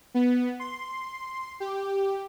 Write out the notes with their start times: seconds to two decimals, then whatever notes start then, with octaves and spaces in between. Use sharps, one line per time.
0.14 B3
0.60 C6
1.60 G4